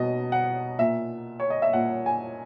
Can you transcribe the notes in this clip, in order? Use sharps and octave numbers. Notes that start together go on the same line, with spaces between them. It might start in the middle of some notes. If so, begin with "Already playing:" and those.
Already playing: B2 D#5
F#5
A#2 E5
C#5
D#5
E5
A#2 F#5
G#5